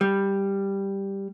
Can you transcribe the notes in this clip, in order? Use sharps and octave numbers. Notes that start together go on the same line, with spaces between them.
G3